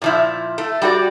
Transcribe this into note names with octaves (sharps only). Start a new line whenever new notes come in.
A#2 F3 E4
A3
G3 F#4 D5